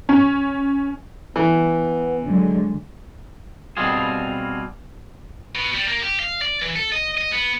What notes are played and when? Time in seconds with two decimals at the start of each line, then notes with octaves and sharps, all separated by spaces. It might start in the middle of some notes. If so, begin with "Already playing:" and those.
0.09 C#4
1.36 E3 B3
2.26 D3 F#3 G#3
3.77 B2 G3 C4 F4 G#4
5.55 B2
5.75 G3
5.88 A#3
6.02 G4
6.20 F5
6.42 D5
6.62 E3
6.76 A4
6.92 D#5
7.18 D#5
7.32 B3